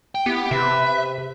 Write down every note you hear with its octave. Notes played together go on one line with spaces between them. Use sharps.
G5
B3 E4 G4
C3 B4 E5